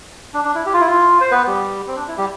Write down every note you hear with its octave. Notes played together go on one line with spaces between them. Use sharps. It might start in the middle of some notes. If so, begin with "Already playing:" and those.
D4
D4
E4
G4
F4
E4
F4
C5
B3 B4
G3 G4
C4
D4
E4
G3 G4